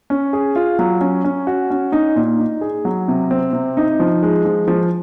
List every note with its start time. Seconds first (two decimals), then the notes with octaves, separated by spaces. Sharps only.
0.10 C#4
0.33 G#4
0.56 F4
0.79 F#3
1.01 C#4
1.25 C#4
1.47 F#4
1.70 C#4
1.92 D#4
2.16 A#2
2.39 D#4
2.61 G#4
2.85 F#3
3.08 C3
3.31 C4
3.53 C3
3.77 D#4
4.00 F3
4.23 G#3
4.45 F3
4.68 F3